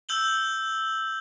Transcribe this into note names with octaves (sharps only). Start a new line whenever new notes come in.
E6 G6 F#7 G7